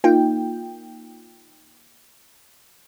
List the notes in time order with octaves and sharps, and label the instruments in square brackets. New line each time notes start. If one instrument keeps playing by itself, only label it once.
[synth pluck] A#3 D#4 F4 G5